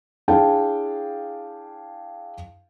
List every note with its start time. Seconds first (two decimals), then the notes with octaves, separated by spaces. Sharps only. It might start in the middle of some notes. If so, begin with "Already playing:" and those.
0.28 D4 E4 G#4 F5 G5 A5